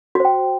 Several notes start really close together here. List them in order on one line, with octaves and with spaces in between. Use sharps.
F#4 C5 G5